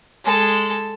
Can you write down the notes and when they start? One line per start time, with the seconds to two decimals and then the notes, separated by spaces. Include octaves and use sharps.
0.25 G#3 A4